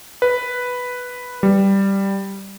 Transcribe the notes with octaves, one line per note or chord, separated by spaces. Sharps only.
B4
G3